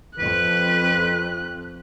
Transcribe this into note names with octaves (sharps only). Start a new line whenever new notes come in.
F2 B4 F#6